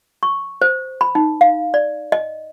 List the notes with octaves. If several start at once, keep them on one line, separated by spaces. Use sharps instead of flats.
C#6
C5
B5
D#4
F5
D5
D#5